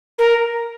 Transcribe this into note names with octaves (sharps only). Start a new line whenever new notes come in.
A#4